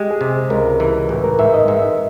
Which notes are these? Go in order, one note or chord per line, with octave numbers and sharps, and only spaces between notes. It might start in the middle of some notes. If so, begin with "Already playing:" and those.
Already playing: G#3 G4
G#4
C3
C#2 A#4
E3
A1 B4
A#4
G#2 E5
D#5
G#2 E5